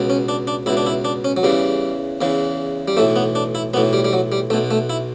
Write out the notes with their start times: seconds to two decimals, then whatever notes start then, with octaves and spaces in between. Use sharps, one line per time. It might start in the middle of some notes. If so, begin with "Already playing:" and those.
Already playing: C#2 B2
0.10 C#4
0.29 D4
0.47 D4
0.66 C#2 B2 E4
0.77 D4
0.87 E4
1.05 D4
1.25 C#4
1.37 F#3
1.43 E2 C#3 E3 G3
2.21 E2 C#3 E3
2.88 G3
2.97 B1 A2 E3 A3
3.16 B3
3.35 D4
3.55 E4
3.74 B1 A2 E3 B3
3.93 G3
4.05 G3
4.13 F#3
4.32 G3
4.50 B1 A3
4.53 B2
4.71 A3
4.90 E4